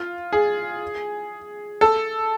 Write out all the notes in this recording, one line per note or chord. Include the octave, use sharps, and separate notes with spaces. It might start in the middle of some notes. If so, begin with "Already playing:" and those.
Already playing: F4
G#4
A4